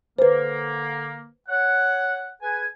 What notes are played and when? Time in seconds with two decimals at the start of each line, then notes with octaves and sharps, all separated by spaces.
0.19 D3 A#3 B4 C5
1.49 C#5 F#5
2.42 G#4 B4 G#5